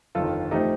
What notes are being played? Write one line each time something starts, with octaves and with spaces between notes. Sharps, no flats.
G1 F2 D#3 F4 A4
C3 F3 A3 D#4 G4